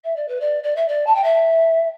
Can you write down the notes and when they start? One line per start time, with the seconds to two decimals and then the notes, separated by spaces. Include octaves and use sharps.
0.04 E5
0.16 D5
0.28 B4
0.40 D5
0.63 D5
0.76 E5
0.88 D5
1.06 A5
1.15 G5
1.23 E5